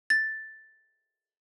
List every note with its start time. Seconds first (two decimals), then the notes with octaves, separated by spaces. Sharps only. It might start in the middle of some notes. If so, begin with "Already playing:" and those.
0.10 A6